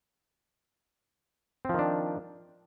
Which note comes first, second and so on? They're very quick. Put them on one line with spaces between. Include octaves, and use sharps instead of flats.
C4 F3 D#3 D4